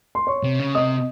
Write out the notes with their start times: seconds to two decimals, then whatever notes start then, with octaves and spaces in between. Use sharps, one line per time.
0.15 C6
0.27 C#5 C#6
0.43 C3
0.59 C#3
0.75 C3 D#5 D#6